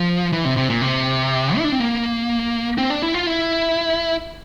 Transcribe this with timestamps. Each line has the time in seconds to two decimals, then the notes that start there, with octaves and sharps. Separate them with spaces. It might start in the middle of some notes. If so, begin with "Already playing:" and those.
Already playing: F3
0.32 E3
0.45 C3
0.57 C3
0.70 A#2
0.81 C3
1.57 E4
1.65 D4
1.72 C4
1.80 A#3
2.78 C4
2.90 D4
3.02 E4
3.14 F4
3.27 E4